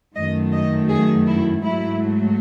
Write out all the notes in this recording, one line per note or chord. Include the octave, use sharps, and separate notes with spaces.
F#2 D#3 A3 D#5
D#5
G#4
E4
G#2 F#3 A3 E4